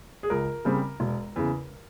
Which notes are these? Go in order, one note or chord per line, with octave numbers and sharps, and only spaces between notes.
G#4
C#2 A#4
C#3 G3 C4
E1
E2 C#3